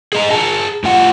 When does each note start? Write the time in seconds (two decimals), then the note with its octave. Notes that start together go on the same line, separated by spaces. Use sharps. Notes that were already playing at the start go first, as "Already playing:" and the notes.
0.13 G#4 D#5 A#5
0.31 G#4 A5 A#5
0.84 A2 F4 F#5